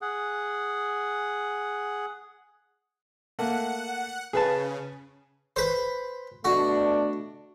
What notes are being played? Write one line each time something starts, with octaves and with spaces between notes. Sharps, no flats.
G#4 F#5
A3 A#3 F#5
C#3 G#4 B4 A5
B4 C5
B2 A3 D4 F#4